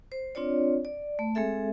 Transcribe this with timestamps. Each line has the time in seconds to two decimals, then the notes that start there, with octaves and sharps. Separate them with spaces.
0.12 C5
0.35 C4 D4 F4 C#5 D5
0.85 D5
1.19 A3
1.35 G#3 C4 G#4 A4 E5